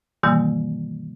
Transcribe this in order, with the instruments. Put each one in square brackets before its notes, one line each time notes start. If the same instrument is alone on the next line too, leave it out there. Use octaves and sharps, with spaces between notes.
[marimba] G2 B2 D#3 E3 G3 A#3